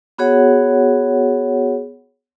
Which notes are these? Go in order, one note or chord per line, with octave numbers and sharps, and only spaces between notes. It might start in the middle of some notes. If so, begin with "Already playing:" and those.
B3 F#4 G#4 C#5 F#5